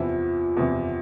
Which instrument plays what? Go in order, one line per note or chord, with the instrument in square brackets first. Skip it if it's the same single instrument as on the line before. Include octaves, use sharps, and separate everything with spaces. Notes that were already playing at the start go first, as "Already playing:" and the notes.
Already playing: [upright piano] E2 C3 F3 E4
E2 C3 F3